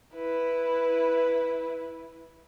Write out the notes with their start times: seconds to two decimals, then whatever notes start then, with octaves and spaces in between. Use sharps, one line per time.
0.15 E4 B4